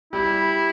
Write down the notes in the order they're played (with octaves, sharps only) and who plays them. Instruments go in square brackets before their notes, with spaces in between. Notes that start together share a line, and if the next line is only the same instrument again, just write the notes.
[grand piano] G3 [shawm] E4